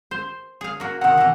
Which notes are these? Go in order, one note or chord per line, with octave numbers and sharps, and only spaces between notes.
C5
G#4 F5
A#3 F#4
C3 D#3 F#5
B2 E3